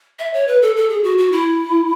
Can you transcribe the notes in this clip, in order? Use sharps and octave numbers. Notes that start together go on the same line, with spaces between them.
E5
C#5
B4
A4
A4
G#4
F#4
F#4
E4